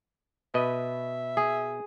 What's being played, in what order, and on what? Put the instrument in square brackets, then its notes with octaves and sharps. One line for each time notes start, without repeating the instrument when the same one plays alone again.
[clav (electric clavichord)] B2 B4 D#5 [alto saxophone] E5
[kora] G#4